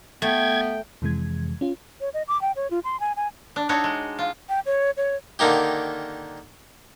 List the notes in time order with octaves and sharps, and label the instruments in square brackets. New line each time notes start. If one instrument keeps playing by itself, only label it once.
[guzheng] A3 [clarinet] B3 [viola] G5 [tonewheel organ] G#6
[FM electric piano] F2 C3 E3 G#3 G#6
C#4 F4
[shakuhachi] C#5
D#5
D6
G5
C#5
F4
C6
G#5
G#5
[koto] D4
D4 D#4 F#4 A4 C#5
G#3
F4
[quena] G5
C#5
C#5
[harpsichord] D3 D#3 A#3 D#4 G4